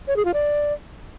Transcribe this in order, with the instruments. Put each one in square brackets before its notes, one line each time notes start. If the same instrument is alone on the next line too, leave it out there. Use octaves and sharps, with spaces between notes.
[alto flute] C#5
G#4
F4
D5